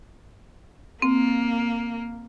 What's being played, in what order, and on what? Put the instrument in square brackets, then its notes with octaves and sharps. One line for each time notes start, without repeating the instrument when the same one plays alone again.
[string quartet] A#3 [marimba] C4